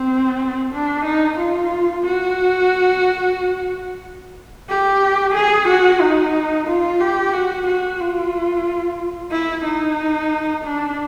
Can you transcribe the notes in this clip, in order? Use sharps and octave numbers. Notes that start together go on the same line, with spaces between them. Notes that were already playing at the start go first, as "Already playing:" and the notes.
Already playing: C4
D4
D#4
F4
F#4
G4
G#4
F#4
D#4
F4
G4
F#4
F#4
F4
E4
D#4
D4